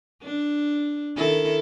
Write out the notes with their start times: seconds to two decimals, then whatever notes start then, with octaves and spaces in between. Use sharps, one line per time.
0.23 D4
1.17 D#3 E4 A4